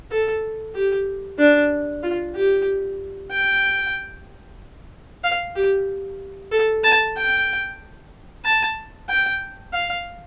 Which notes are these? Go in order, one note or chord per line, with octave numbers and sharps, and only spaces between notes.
A4
G4
D4
F4
G4
G5
F5
G4
A4
A5
G5
A5
G5
F5